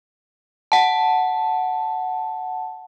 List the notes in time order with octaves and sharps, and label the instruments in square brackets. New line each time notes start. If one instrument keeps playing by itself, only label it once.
[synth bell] F#5 A5